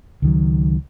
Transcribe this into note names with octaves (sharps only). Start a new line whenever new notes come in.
C#2 D#3 F#3